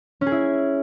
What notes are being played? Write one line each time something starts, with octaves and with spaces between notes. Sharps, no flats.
C#4
G#4
E4